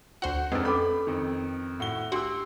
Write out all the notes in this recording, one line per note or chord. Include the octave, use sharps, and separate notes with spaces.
D2 F#4 C5 F#5
F1 F2 G#3 D4 B4
C4 C#4 A4 B5 D6
F2 D#3
A2 F#4 G7
D4 F#4 G4 C6 E6